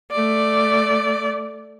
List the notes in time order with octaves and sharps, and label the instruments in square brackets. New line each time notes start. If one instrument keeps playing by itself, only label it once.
[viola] A3 D5